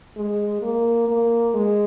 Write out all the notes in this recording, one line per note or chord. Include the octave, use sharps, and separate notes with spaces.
G#3
A#3
A#3
G#3